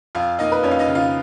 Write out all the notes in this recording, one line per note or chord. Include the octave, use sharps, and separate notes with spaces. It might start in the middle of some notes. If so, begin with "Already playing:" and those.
F2 F4 F5
A#3 D#4 D#5
B4
F2 C#4 C#5
F5
D#4 D#5
C#3
F4 F5